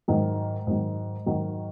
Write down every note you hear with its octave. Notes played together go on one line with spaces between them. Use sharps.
G#2 D#3 F#3
G#2 D#3 F#3
G#2 D#3 F#3